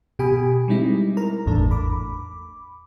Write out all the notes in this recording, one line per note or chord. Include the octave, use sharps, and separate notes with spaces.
B2 G4 G#5 B5 D#6
G3 G#3 C4 D#4 E4
A#4 A#5
G#1 E2 A2 D4 A4
B5 D6